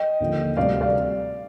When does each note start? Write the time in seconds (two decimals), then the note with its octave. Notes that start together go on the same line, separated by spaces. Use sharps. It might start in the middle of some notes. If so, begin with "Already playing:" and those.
Already playing: D#5 G5
0.20 D#2 D3 F3
0.57 D2 C3 G3 D5 F5
0.81 D5 F5